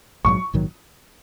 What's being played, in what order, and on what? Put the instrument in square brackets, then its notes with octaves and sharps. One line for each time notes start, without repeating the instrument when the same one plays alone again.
[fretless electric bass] A#1 G#2 D#3 F#3 [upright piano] C#6
[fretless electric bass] A#1 G#2 D#3 F#3